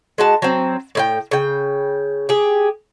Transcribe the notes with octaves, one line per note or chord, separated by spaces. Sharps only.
G#3 F#4 A5
F#3 C4
A2 E4 G5
C#3 G5
G4 G#4